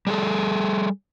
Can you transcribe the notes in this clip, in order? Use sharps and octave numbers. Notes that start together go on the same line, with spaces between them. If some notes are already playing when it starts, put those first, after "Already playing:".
G3 G#4 A4